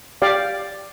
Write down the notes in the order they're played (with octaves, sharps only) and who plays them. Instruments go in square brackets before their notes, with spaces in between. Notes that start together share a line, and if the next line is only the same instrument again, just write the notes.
[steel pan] G4 D5 F5